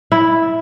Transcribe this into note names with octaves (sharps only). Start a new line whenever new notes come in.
E4